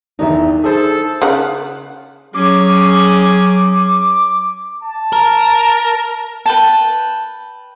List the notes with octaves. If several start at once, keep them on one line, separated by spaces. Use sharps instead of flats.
E2 D#3 D4 D#4 E5
G#4 A4 C5
C#3 F#5
F#3 C#4 G#4 D6
A5
A#4
B4 G5 A5